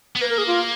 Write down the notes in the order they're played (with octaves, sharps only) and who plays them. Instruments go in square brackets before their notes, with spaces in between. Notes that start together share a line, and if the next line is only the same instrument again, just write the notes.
[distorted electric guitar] B3
[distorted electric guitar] A#3 [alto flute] B4
[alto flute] A#4
G#4
F4